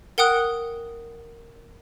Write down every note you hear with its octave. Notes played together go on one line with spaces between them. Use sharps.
A#4 F#5 G5 D#6 F#6